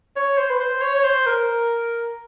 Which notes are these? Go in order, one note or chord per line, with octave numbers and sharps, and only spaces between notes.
C#5
C5
B4
C5
C#5
C#5
C5
A#4